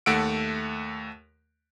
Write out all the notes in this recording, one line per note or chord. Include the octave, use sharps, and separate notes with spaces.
D#2 A3 F#5 E6 D7